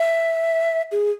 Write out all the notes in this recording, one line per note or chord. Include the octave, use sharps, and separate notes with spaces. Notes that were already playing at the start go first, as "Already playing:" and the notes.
Already playing: E5
G#4